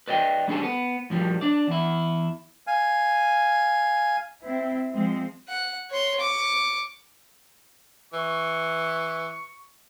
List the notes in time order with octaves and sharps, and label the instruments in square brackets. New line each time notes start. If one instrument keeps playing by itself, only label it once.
[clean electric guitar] B4 D5 D#5 G5
G3 C#4 D4 G#4 A4
B3
G2 F3 G3
D4 D5
E2 E4
[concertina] F5 G#5
[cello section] C4 E4
F3 G#3 C4
[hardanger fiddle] F#5
C#5 C6
C#6 D6
[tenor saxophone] E3 [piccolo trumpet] C#6